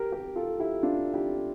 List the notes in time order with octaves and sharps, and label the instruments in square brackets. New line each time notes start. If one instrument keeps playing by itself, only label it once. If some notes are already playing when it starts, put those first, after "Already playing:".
Already playing: [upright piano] G4 A#4
G4 A#4
F4 A4
E4 G4
D4 F4
E4 G4